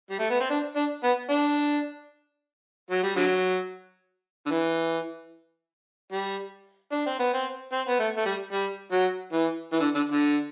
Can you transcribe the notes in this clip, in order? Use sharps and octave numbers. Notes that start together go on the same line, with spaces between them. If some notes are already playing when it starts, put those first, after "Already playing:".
G3
A3
B3
C4
D4
D4
B3
D4
F#3
G3
D3 F#3
D3
E3
G3
D4
C4
B3
C4
C4
B3
A3
A3
G3
G3
F#3
E3
E3
D3
D3
D3